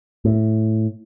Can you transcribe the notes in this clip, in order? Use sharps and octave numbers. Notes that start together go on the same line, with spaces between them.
A2